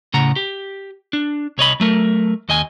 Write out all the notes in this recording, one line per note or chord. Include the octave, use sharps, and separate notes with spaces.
A2 C#3 F#5 A#5
G4
D4
C2 C#5 D#5 B5
F#3 A3 A#4
D#2 D#5 G#5